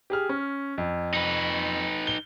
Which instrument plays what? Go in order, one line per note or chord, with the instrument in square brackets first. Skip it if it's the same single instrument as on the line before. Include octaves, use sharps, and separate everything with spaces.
[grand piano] G4 G#4 F6
C#4
F2
[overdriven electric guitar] D#4 B4
[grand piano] G7